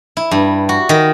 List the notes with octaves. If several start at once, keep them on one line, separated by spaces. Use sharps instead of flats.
E4
G2
F#4
D#3